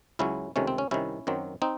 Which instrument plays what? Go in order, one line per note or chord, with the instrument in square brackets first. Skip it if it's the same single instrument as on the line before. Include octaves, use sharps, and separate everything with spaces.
[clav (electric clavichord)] C#2 C#3 F#3 C#4 E4
C#2 C3 D#3 A3 C#4
C4
C#4
C2 C3 D#3 C#4 E4
F#2 D#3 F#3 C4
C4 D#4